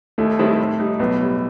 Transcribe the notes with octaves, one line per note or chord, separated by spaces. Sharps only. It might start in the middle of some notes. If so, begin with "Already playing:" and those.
D#2 A3
D#3 G3 C4 E4
A2
G3 D#4
B1 B3
A2 G3